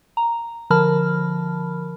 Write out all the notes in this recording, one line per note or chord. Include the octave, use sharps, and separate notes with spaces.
A#5
D3 F3 A#4 A5 B5 F6